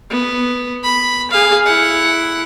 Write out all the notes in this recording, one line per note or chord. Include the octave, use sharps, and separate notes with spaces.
B3
B5
G#4 F5
E4 F#5